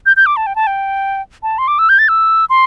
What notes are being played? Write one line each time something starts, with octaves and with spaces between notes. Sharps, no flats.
G6
G6
D6
A5
G5
A5
G5
A5
C6
D6
E6
G6
A6
E6
C6